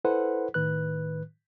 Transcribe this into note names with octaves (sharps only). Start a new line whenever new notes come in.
E4 A4 B4 C5 F#5
A2 D#3 B4 F#6